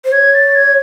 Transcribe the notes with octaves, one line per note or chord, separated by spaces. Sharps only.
C5
C#5 G#6
A6
G#6